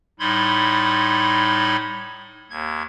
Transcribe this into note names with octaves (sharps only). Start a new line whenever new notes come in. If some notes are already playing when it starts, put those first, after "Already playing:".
A2 G3 D#4 B5 C6 G#6
D#2 G#6